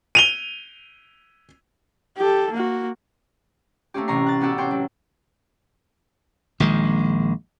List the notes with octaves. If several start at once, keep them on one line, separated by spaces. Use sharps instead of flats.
D#7 F7 G7
G4 A4
A#3 F#4
A3 A#3 C4 C#4 G4
A1 C3 A#5 C#6 C7
F#6 A6
B3 C#4 F#4 G4 A4
C4 C#5 G5 C6
F#3
A#1 D#3 G#3